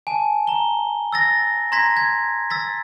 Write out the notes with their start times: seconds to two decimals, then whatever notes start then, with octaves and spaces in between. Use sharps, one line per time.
0.07 G#5 A5
0.47 A#5 G7
1.13 E6 A6 A#6
1.72 A#5 C6 G#6 A#6 B6
1.97 G#6
2.50 E6 A6 B6